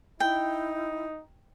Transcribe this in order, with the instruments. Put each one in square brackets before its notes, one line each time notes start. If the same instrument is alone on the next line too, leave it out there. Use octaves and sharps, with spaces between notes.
[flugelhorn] D#4 [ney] E4 [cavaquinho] G5